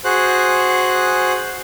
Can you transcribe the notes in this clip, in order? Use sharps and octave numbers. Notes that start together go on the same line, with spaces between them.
F#4 G#4 C5 F#6